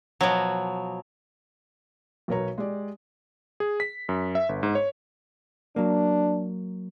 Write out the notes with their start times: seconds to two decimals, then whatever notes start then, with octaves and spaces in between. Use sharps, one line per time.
0.21 B2 F3 F#3
2.28 B1 B2 A#4 B4 C#5 A#5
2.58 G#3 G4 D5
3.60 G#4
3.80 B6
4.09 F#2
4.35 E5
4.49 G1
4.63 G#2
4.75 C#5
5.76 F#3 A#3 D4